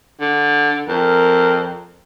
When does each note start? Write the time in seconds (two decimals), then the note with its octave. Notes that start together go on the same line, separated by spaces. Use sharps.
0.20 D3
0.89 F2 A#4